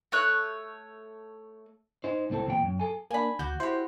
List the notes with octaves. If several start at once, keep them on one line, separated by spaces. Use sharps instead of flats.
A3 C#5 F#6
D#4 C5
C2 A2 C4 A4
E2 A#2 A#4 G5
F#2
A4 G#5
A#3 D4 G#5 B5
D2 F#4 D6 G6
E4 F#4 G4 C5